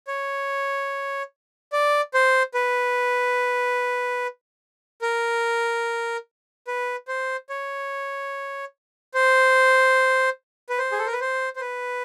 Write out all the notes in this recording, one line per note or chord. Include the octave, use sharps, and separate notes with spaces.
C#5
D5
C5
B4
A#4
B4
C5
C#5
C5
B4
C5
G#4
A4
A#4
B4
C5
C5
B4